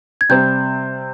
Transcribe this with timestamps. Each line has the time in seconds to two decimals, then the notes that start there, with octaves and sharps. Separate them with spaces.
0.21 G#6
0.29 C3 G3 C4 G6